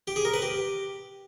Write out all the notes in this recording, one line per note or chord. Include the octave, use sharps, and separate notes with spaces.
G4
G#4
A#4
B4
G4